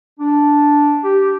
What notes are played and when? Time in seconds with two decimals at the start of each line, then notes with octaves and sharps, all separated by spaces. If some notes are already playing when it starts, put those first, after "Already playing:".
0.19 D4
1.03 G4